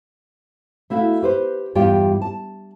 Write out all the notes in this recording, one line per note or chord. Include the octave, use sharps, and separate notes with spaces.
A3 E4 F#4 F5
G4 B4 C5
E2 G2 G3 F4 G4 G5
A5